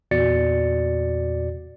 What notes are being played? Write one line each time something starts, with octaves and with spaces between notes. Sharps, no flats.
E2 A#2 F#4 D5 A6 C#7